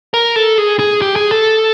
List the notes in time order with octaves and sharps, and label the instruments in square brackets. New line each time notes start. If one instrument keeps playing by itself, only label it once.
[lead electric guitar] A#4
A4
G#4
G#4
G4
G#4
A4